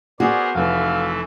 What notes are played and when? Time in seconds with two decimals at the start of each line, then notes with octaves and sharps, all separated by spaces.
0.20 B3 F#4 G#4 A#4 C5 D5
0.55 F1 E3 A3 F5